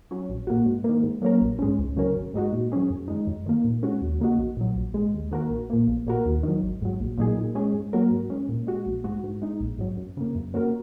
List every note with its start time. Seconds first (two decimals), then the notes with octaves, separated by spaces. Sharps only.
0.11 F#3 C#4
0.30 A#1
0.47 A#2 A#3 F#4
0.66 G#2
0.84 D#3 A#3
1.03 G#2
1.22 F#3 A#3 C#4 A#4
1.41 A#1
1.59 G#2 G#3 C#4
1.78 C#2
1.96 C#3 F#3 C#4 A#4
2.16 G#1
2.34 G#2 G#3 D#4 F#4
2.52 A#2
2.72 F#3 C#4 G#4
2.90 F#2
3.08 D#3 G#3 D#4
3.27 F#2
3.46 D#3 A#3
3.64 A#2
3.83 G#3 C#4 F#4
4.01 D#2
4.20 C#3 A#3 D#4 F#4
4.38 A#1
4.57 A#2 F#3
4.76 A#1
4.94 G#2 G#3
5.14 D#2
5.31 D#3 A#3 F#4 A#4
5.50 A#1
5.70 A#2 A#3
5.88 A#1
6.07 A#2 A#3 F#4 A#4
6.26 D#2
6.43 D#3 F#3
6.63 G#1
6.82 G#2 F#3
7.00 A#1
7.18 A#2 F#3 D#4 G#4
7.37 A#2
7.55 G#3 C#4 G#4
7.74 G#2
7.93 F#3 A#3 F#4 A#4
8.11 G#2
8.30 G#3 C#4
8.49 A#2
8.67 G#3 F#4
8.86 A#1
9.04 G#2 G#3 F#4
9.24 G#2
9.42 G#3 D#4
9.60 A#1
9.79 G#2 F#3
9.97 F#2
10.17 C#3 A#3
10.35 F#2
10.54 C#3 A#3 F#4 A#4